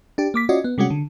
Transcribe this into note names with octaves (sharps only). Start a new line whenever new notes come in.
D4 G4
A#3 D6 B6
C#4 F4 F#4 D5 D#5
B3
C3 G3 G#3 C#4 F#4
D3